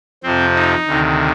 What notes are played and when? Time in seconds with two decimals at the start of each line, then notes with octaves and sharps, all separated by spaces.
0.23 F2 C3 F3 C4
0.55 D#4
0.87 D2 C3 D#3